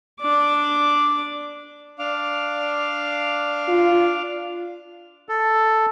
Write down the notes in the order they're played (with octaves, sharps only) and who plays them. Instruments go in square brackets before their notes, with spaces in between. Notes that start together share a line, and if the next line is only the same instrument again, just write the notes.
[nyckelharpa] D4 D6
[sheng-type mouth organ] D4 F5 D6
[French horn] F4
[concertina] A4